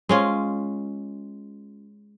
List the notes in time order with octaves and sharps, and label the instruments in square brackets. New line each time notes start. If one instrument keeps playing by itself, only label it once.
[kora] G#3 C#4 F4